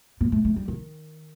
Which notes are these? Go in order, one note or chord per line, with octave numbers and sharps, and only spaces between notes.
A#3
A3
A3
G3
D#3